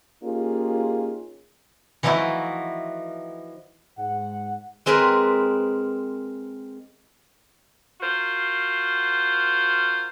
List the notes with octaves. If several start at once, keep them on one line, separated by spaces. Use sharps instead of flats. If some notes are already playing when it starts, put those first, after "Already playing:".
A#3 C#4 D#4 F4 G4 G#4
E3 F3 A3 D#4 E4 F#4
G#2 F#5
G#3 C4 G#4 A#4 B4
F4 F#4 A#4 C5